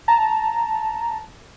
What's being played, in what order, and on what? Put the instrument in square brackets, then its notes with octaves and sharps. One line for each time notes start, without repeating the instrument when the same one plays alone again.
[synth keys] A5 A#5